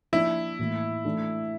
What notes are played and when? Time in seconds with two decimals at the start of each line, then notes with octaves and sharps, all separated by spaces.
0.12 F3 A#3 D4 E4
0.59 A2 E3 A#3
1.05 E3 A3 D4